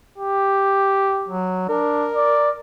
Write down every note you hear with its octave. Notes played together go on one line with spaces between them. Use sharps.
G4
F#3
D4 A#4
D5